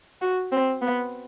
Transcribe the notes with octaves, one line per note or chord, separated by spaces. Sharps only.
F#4
C4
B3